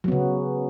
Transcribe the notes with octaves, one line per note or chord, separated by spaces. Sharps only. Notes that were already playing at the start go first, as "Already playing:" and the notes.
C#3 F#3 B3